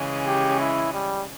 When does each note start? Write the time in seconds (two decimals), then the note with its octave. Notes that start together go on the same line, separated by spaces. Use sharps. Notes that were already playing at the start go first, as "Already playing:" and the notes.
Already playing: C#3 E3 G#3 C#4
0.27 G4
0.60 E4
0.93 G3